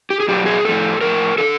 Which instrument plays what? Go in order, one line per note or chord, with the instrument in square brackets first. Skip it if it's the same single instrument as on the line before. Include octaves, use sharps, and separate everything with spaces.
[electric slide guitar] G4
G#4
B2 F#3 G4
G#4
A2 F3 A4
A2 F3 A#4
D3 F3 A4